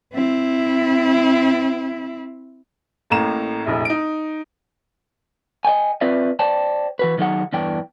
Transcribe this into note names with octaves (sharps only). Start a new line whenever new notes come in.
C4 E4
A1 A2 A#3 A#5 E7
F1 A#1 E4
D#4 D7
D#5 E5 G5 G#5
C4 F4 B4 D5 E5
C5 D5 G5 A5
E3 F#4 B4
D#3 F#3 D#4 G#4 F#5
E2 G2 E3 D4 G5